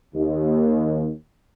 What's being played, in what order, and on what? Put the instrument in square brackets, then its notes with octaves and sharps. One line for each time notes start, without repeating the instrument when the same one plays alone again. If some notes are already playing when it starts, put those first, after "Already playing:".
[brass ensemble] D#2